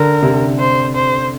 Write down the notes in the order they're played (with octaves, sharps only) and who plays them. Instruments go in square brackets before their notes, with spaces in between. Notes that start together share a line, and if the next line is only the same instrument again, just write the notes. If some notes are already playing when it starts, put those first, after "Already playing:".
Already playing: [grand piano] D3 [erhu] A#4
[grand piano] C3
[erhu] C5
C5